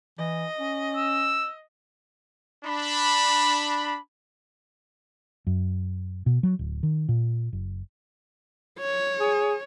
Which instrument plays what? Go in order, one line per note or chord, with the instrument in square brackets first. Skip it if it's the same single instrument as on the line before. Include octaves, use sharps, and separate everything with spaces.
[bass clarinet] E3 [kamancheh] D#5
[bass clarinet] C#4
[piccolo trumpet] E6
[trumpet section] D4 B5
[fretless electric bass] F#2
B2
F#3
D1
D#3
A#2
F#1
[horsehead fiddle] C#5
[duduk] G#4